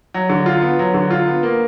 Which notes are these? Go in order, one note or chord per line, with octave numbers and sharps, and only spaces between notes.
F#3
D3
F4
B3
F#3
D3
F4
B3
A#3